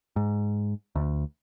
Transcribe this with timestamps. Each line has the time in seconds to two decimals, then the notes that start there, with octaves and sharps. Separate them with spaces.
0.16 G#2
0.96 D2